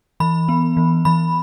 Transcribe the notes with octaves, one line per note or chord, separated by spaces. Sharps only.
E3 B5
B3
E3
E3 B5